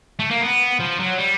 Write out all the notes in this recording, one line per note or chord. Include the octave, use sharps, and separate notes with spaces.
A3
A#3
B3
F3
F#3
G3